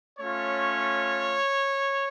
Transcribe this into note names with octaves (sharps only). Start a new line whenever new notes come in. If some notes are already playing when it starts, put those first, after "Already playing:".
A3 C#4 F4 C#5